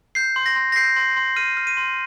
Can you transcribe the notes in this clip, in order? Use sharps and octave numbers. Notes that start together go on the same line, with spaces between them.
G6 C7
C6
A#6
C6
A#6
G6 C7
C6
C6
F6 D#7
F6
D#7
C6